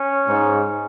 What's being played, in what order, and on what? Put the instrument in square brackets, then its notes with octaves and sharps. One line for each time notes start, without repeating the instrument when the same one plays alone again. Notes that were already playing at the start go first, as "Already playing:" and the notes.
Already playing: [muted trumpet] C#4
[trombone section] G#2